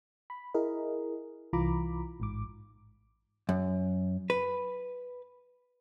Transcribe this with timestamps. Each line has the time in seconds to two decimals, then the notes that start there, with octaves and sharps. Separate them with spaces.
0.30 B5
0.54 E4 G#4 A#4 D#5
1.53 C2 E3 F4 A#5 B5 D6
2.20 A1 G#2 D6
3.49 F#2
4.30 B4